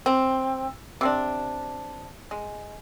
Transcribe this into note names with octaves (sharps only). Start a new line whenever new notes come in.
C4
C3 C4 D4
G#3